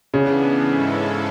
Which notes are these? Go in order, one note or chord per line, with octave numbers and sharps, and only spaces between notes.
C#3 E3 B3 D4
G#2 G#3 C#4 E4 A4